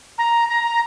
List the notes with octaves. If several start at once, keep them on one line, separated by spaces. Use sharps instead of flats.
A#5
A#5
A#5